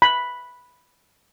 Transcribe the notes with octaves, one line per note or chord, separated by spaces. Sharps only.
B5